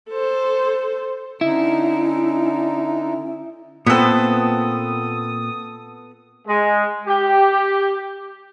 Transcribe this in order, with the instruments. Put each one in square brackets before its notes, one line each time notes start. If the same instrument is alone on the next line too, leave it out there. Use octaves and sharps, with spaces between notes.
[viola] A4 C5
[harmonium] D3 D#4 [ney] C#4 [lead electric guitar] E4
[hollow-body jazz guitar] A#2 C4 [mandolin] B3 A4 [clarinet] D#6
[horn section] G#3
G4